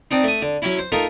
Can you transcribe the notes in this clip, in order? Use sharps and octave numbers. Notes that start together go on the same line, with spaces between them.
C4 D4 D#4
A3 D#6
D3
F#3 C#4 E4
C5
A3 D#4 F4 A#4